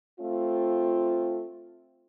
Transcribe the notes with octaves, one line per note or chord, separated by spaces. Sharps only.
A3 C4 F4